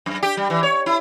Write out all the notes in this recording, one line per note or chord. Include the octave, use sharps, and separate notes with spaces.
F#2
G4
G3
E3
C#5
E4